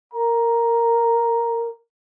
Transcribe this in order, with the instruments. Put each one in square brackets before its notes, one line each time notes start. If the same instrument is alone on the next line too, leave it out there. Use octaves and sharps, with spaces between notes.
[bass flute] A#4 [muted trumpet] A#5